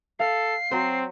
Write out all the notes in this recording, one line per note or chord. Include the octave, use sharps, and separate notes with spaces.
A4 F5 C7
F#3 C4 C5